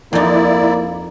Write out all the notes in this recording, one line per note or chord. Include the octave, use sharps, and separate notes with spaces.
F2 A#3 D#4 E4 D5